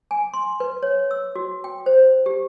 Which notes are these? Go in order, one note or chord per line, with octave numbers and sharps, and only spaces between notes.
G#5
C6
B4
C#5
E6
F#4
G5
C5
G4